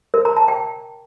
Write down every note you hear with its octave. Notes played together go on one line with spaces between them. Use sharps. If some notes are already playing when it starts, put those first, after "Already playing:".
A#4
A#5
A5
G5